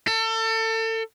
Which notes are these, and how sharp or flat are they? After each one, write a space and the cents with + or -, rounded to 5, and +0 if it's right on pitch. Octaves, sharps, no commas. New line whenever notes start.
A4 +30